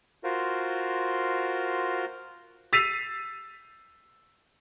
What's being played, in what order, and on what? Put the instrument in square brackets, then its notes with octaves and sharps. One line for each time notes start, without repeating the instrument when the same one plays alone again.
[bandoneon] F4 F#4 A#4 C5
[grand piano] E6 A6 B6 C7 D#7 F7